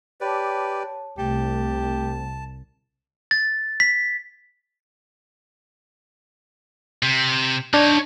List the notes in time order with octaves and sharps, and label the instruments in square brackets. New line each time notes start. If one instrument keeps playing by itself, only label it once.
[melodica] G4 B4 D5 [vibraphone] C#5 A5
[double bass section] C2 [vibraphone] A3 [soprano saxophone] G4 [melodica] A5
[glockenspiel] A6
B6
[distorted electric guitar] C3
[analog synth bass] D4 [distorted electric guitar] D#4 C#5